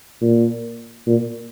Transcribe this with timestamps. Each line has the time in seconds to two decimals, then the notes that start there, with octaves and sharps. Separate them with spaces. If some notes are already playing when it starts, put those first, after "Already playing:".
0.21 A#2
1.06 A#2